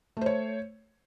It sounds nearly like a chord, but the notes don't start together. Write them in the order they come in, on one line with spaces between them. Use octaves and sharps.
A3 C5 C#5